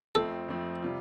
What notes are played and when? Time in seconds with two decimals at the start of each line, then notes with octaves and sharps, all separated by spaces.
0.15 F2 F3 A3 C4 A4
0.48 F2 F3 A3 C4
0.82 C3 G3 F4